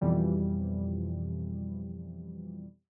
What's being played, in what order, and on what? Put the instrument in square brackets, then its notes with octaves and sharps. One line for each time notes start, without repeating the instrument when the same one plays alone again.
[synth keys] F2 B2 E3 F3 G3